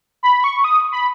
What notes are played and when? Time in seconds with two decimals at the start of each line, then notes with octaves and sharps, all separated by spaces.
0.23 B5
0.44 C#6
0.64 D#6
0.92 B5